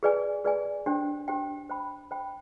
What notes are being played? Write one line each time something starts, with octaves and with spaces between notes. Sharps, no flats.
G#4 B4 D5 G#5
G#4 B4 D5 G#5
D4 G4 C5 G5
D4 G4 C5 G5
C5 G5 B5
C5 G5 B5